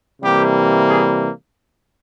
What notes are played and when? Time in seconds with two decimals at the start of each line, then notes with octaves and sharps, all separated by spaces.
0.22 C3 E3 G3 A#3 G4
0.90 G#4